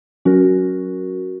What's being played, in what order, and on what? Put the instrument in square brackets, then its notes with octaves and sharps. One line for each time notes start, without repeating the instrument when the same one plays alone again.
[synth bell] F#3 C#4 F#4 A#4